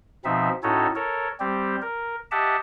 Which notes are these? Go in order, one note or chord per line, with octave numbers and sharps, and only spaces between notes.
B2 F3 C4 D#4 E5
A2 C#4 D#4 F#4 A4 C#5
A4 A#4 C#5
G3 C4 G4
A#4
G4 D#5 E5 F#5 A5